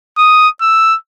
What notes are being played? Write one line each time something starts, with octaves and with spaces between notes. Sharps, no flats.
D#6
E6